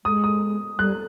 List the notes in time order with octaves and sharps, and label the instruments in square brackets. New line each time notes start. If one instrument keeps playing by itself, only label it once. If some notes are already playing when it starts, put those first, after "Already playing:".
[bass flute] G#3 [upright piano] D#6
[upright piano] D#6
[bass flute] G3 [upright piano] F#6